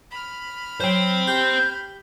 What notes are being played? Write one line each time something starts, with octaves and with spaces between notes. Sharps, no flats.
B5 F6
F#3 C5 G5
G4 G6